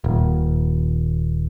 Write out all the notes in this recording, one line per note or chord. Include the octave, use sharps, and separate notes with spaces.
D#1